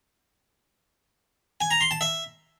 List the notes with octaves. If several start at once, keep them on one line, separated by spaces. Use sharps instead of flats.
G#5
A#5
C6
A5
E5